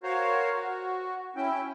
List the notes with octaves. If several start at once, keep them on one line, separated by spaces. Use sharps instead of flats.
F#4 A#4 C5 C#5 F5
F#4
C#4 E4 G5